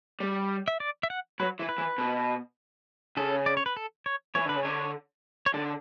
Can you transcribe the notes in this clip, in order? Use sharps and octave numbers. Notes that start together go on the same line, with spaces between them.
G3
E5
D5
E5
F#5
F#3 B4
E3
B4
E3
B2
C#3 A4
D5
C#5
B4
A4
C#5
E3 C#5
D3 B4
C#3
D3 C#5
C#5
D3 D5